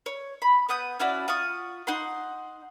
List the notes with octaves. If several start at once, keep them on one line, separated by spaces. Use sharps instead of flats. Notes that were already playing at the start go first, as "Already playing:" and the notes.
C#5
B5
B3 F#5 D#6 G6
C#4 E4 F#4 D5
F4 F#5 C#6 D#6
D#4 F#5 C6